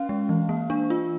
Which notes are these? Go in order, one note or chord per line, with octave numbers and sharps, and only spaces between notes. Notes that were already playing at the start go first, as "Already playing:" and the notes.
Already playing: C#4 F5
G#3
E3
A#3
D4
F4